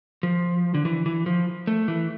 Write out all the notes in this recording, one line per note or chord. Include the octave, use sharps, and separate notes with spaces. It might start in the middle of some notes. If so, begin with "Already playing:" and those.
F3
D3
E3
E3
F3
A3
E3